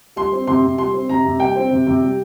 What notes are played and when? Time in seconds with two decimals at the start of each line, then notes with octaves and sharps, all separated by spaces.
0.16 G3 C6
0.32 C4
0.47 C3 C6
0.62 C3
0.78 G3 C6
0.94 C4
1.09 C3 A#5
1.24 C3
1.39 G3 G5
1.56 C4
1.71 C3
1.87 C3
2.02 G3